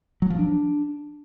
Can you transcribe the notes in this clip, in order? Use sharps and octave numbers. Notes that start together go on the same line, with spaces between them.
F#3
F3
D4